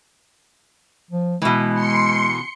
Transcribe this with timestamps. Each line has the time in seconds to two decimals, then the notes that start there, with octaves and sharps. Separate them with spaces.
1.11 F3
1.42 B2 E3 G#3
1.74 C6 C#7